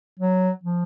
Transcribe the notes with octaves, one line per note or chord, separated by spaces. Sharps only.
F#3
F3